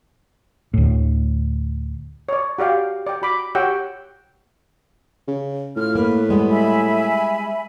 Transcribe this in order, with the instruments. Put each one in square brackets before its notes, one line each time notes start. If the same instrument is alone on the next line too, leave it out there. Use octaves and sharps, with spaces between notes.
[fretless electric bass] D2 A2
[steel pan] C#5 D5
F#4 G4 D5 F5 G5
D5 G5
F#4 B5 D6
F#4 G4 C#5 F#5 G5 E6
[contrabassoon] C#3
[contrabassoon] A2 [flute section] F4 F6
[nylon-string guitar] A#3 [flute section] B4
[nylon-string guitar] G3 G#3 B3
[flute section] E5 G#5 B5